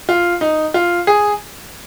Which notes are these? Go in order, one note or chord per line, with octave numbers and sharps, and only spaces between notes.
F4
D#4
F4
G#4